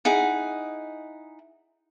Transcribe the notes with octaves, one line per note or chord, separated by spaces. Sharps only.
D#4 E4 G#4 F#5